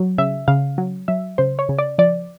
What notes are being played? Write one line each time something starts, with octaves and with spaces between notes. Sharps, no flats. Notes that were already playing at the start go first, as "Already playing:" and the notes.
Already playing: F#3
C#3 E5
C#3 F5
F#3
F#3 E5
C#3 C5
C#5
C#3
D5
F3 D5